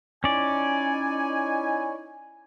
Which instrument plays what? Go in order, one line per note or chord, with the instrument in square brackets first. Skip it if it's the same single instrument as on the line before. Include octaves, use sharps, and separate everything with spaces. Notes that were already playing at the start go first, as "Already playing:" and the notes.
[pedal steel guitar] C#4 D5 [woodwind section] D#4 E4 G#5